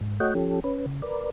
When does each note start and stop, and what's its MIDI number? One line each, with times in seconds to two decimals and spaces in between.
0.01 0.20 44
0.20 0.34 57
0.20 0.34 66
0.20 0.34 73
0.20 0.34 75
0.20 0.34 78
0.20 0.34 79
0.35 0.60 53
0.35 0.60 61
0.35 0.60 67
0.35 0.60 69
0.64 0.86 61
0.64 0.86 71
0.86 1.02 49
1.02 1.30 70
1.02 1.30 71
1.02 1.30 74